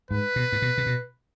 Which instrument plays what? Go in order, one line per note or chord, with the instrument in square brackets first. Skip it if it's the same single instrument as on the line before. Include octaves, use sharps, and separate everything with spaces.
[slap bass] G#2 [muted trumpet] B4
[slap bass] B2
G#2
B2
C3
B2